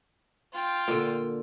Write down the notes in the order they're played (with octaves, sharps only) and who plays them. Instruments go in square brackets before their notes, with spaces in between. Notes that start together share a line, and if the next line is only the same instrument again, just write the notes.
[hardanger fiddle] F4 G5
[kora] A#2 D3